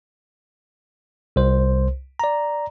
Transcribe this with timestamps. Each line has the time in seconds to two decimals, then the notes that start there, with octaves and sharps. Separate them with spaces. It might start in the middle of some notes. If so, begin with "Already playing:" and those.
1.36 C2 C5
2.19 D5 A#5